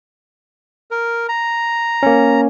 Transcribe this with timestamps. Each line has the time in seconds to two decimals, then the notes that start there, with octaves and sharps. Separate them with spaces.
0.91 A#4
1.29 A#5
2.03 A#3 C#4